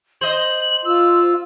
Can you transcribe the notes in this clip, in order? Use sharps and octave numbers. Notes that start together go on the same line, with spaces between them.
C5 D#5 F#7
F4 E6